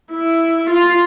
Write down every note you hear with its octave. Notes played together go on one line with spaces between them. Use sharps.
E4
F4